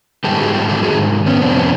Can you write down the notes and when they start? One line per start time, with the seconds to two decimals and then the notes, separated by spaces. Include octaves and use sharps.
0.24 G#2 D#3 G3 G4 A4
0.39 F#4 G#4
0.53 F4 G4
0.69 G4 A4
0.83 F#4 G#4
1.26 B3 C#4
1.41 F2 C3 E3 G3 C4 D4
1.56 B3 C#4